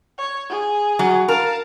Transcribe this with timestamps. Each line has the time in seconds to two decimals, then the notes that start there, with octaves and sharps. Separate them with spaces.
0.18 C#5
0.49 G#4
0.99 F#3
1.28 A#4 F5 A5